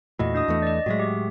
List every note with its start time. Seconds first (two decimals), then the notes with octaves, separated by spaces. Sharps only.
0.19 E2 A#2 A3 E4 F#4 D#5
0.34 D4 D#5 D#6
0.48 E2 E3 A3
0.62 D5 D#5
0.86 A2 F#3 G#3 F#4 E5
0.99 G4